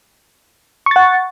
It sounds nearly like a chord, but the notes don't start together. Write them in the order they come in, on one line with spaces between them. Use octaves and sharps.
C#6 A6 F#5